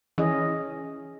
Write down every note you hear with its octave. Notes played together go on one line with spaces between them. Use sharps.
E3 C#4 G#4 D#5